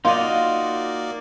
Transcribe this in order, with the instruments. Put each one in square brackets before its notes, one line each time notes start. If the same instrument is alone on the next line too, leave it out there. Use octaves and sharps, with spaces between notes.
[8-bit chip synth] A#3 D5 [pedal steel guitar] D#4 F#4 D#5 [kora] F4